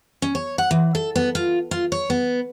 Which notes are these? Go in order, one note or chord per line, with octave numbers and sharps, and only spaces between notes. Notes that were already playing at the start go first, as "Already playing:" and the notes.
C#4
C#5
F#5
E3
A4
B3
F4
F4
C#5
B3